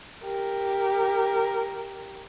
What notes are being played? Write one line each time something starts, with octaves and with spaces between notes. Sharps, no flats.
G4 A#4